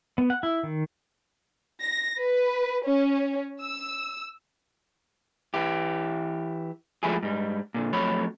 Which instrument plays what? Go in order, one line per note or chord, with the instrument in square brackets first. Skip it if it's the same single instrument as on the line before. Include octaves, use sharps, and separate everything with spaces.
[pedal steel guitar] B3
F#5
E4
D#3
[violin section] A#6
B4
C#4
E6
[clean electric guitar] E3 E4 G4
F3 G#3 A3 E4 G4 G#4
G#2 G3
A#2 D3
F2 F#3 A3 C#5 B5